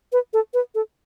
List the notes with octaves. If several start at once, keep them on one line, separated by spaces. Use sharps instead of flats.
B4
A4
B4
A4